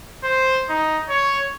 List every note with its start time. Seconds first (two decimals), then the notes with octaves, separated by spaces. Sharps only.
0.24 C5
0.69 D#4
1.09 C#5